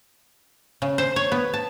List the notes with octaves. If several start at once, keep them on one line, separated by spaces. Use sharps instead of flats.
C#3
C5
C#5
B3
A5